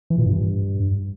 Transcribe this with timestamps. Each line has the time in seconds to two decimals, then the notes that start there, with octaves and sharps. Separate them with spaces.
0.10 E3
0.18 A#2
0.26 G2